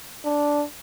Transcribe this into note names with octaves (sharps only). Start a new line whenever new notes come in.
D4